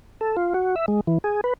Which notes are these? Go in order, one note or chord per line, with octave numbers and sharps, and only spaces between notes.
A4
F4
F#4
E5
G#3
E3
G#4
B4